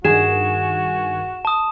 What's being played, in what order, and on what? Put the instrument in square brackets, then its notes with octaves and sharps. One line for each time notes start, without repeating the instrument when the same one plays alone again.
[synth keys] G2 D#3 G#5 [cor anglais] F#4 [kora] G#4 [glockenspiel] E7
[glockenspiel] A5 D#6